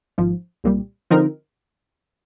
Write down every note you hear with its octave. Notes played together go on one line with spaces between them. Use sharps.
G#1 G#2 F3
C2 A#2 G3
D3 F3 C4 D#4 A#4